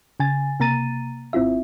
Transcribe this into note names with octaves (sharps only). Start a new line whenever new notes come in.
C#3 G#5 A6
C3 A#3 A#5 A6 D#7
G#1 C4 E4 F4 E5